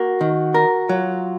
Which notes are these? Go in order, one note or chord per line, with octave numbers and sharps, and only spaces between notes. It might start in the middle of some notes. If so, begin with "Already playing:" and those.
Already playing: A#3 F#4
D#3
A#4
F#3 F4